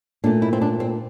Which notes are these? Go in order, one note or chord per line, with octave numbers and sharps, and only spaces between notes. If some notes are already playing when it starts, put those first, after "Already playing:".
A#2 A3 D4
E4
C4
D4
C4